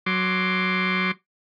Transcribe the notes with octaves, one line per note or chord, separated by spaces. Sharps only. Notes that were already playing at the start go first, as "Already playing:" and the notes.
F#3 C6 D6